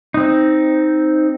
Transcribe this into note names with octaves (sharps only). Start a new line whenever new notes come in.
C4 D#4